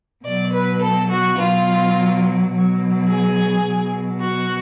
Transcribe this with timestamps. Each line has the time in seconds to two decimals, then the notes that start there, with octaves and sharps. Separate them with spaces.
0.25 B2 F#3 D5
0.54 B4
0.82 A4
1.10 F#4
1.38 B2 F#3 F4
2.51 B2 F#3
3.07 G#4
3.64 B2 F#3
4.20 F#4